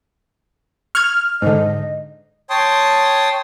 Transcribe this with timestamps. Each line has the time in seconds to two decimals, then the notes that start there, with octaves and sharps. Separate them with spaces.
0.95 C#6 F6 F#6 G#6
1.42 G#2 D3 D#5
2.50 C#5 G5 A5 C6 D#6